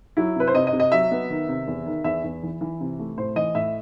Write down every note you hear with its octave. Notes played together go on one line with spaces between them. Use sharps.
F#3 E4
C3 B4
C5
C3 D#5
D#5
C3
D#5
F#3 E5
B3
D#3
C3
E2
D#3
E2 E5
E2
E3
E3
C3
A3
A2 C5
E3 D#5
A2 E5